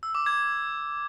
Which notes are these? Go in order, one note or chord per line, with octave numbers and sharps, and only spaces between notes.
E6
D6
G#6